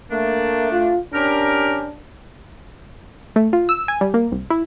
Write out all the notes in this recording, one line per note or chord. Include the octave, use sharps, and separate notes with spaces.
A3 A#3 D4
F4
C#4 D4 G4 A#4
A3
F4
E6
G#5
G3
A#3
C2
E4